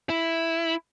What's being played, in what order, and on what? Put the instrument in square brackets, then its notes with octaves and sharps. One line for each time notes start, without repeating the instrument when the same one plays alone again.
[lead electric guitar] E4